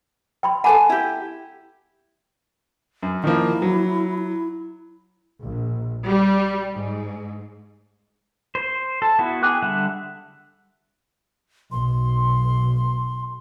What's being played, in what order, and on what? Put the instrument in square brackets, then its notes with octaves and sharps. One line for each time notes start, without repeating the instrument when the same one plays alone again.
[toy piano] G5 B5 C6
[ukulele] A4 B4 G#5 [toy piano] F#5 B5 D6
[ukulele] E4 G4
[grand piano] F#2
[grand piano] D#3 F3 A#3 [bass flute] E4
[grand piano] F#3
[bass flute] E4
[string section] A#1
G3
G#2
[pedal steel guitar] C5
A4
B3 E4 F#4
G#4 G5 D6 F#6
D3 G3 E5 F#5
[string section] B1 [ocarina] C6